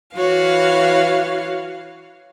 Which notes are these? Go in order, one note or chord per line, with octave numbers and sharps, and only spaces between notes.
E3 F#4 C#5 F5